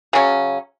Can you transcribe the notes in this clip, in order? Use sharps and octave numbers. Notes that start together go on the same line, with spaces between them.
C#3 F#3 C#4